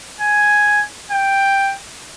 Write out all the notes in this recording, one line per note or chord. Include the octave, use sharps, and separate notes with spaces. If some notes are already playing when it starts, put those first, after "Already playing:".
G#5
G5